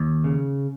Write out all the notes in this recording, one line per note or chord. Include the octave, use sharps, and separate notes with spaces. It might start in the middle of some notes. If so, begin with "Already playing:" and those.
Already playing: D#2
C#3